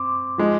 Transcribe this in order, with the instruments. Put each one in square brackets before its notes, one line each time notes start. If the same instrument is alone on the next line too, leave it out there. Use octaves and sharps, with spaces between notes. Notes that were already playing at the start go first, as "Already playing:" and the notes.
Already playing: [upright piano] C4 [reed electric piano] C6 D6
[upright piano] F3 G#3 D#4